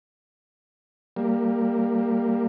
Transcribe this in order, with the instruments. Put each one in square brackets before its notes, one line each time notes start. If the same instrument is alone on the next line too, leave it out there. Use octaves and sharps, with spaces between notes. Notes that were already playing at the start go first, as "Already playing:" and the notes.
[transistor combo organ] G3 A#3